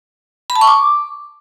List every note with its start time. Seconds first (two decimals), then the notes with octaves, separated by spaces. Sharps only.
0.50 B5
0.56 A5
0.61 C#6
0.67 D6